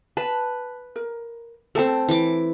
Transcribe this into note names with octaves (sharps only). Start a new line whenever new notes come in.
B4 A5
A#4
A3 C4 A4 E5 A5
E3 D6